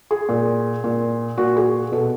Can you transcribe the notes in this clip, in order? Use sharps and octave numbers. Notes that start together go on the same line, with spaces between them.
G#4
A#2
A#2
A#2 F#4
G#4
B2 A4